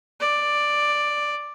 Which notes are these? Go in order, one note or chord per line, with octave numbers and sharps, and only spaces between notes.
D5